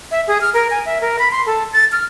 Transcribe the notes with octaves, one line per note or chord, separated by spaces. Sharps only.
E5
G#4
F6
A#4
G#5
E5
A#4
B5
C6
A4
A6
F6